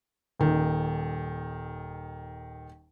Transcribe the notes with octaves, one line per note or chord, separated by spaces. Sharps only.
D#1 D#3